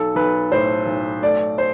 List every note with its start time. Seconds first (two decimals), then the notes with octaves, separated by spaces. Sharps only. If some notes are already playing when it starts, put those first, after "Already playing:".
Already playing: B1 A4
0.15 B1 B4
0.52 A2 C5
0.86 B1
1.22 A3 D5
1.58 C5